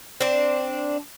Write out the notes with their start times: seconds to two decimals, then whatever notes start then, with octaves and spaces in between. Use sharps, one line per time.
0.21 C4 D4